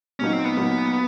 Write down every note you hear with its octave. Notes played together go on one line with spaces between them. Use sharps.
A#2 F#3 A#3 C#4 D#4
C4
B3
A#2 F#3 A#3 D#4